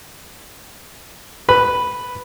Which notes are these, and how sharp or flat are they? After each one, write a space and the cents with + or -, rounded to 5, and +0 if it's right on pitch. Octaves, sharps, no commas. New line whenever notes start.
B4 +0 B5 +0